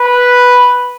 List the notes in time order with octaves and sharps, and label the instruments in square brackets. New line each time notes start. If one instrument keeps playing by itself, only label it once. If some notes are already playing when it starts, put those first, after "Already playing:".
Already playing: [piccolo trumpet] B4